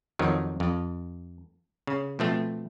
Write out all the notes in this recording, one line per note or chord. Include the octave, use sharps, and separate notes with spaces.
F2 D#3 F3 F#3
F2
C#3
B2 F3 A3 C4